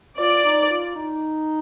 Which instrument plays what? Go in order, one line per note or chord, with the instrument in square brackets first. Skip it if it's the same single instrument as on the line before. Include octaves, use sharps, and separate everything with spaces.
[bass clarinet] F4 [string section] D5
[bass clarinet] D#4
F4
D#4